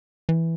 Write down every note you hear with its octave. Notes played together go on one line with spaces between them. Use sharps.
E3